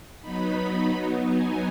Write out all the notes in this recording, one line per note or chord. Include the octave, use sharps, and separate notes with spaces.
F#3 B3 D#4 B5
G#5